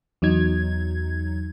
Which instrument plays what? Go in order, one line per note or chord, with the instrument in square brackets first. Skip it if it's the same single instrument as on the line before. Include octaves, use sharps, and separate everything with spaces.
[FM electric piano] E2 F#3 D#4 G#6